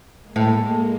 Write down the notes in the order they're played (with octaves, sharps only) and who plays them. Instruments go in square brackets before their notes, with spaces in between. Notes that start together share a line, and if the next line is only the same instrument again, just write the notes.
[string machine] G#3 A#3
[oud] A2